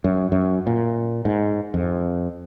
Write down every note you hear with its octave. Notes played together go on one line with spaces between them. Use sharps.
F#2
F#2
A#2
G#2
F2